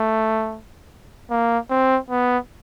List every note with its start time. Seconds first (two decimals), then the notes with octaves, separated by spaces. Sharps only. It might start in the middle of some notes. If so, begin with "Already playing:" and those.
Already playing: A3
1.31 A#3
1.70 C4
2.10 B3